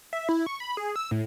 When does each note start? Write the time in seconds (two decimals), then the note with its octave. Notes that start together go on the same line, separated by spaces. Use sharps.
0.13 E5
0.29 E4
0.46 C#6
0.60 B5
0.77 G#4
0.96 E6
1.11 A2